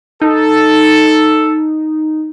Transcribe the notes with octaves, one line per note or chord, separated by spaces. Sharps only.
D#4 A4